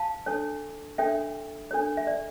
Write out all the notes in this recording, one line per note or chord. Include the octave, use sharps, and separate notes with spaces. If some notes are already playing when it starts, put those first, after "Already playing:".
Already playing: F5 A5
D4 A4 C#5
D4 A4 C#5 E5 G5
D4 A4 C#5
E5
D5